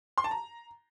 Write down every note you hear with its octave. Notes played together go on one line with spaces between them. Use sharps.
C6
A5
A#5